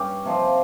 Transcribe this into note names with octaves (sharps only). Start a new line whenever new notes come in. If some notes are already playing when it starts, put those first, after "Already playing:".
Already playing: G2 G3 C#4 G4
C3 F3 C4